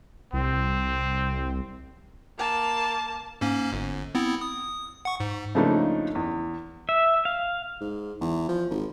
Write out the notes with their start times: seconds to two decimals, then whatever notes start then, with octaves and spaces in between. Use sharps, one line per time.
0.33 C2 C4
2.39 A#3 A5
3.41 G#2 A#3 C#4
3.73 G1
4.15 B3 C4 E4
4.41 D#6
5.05 F#5 C#6
5.20 G#2
5.55 C#3 F3 A3 A#3 D4 D#4
6.15 E2
6.89 E5
7.25 F5
7.81 G#2
8.21 E2
8.49 F3
8.70 G#1